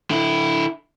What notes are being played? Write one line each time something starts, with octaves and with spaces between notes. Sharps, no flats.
D3 E4